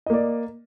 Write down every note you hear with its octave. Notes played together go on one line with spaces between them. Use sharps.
A#3 D5 D#5